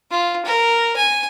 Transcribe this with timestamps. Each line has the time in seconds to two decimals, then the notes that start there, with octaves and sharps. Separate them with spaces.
0.11 F4
0.46 A#4
0.97 G#5